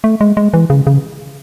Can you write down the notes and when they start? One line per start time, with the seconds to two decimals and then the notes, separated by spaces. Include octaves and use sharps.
0.04 A3
0.21 G#3
0.37 G#3
0.54 E3
0.70 C#3
0.87 C#3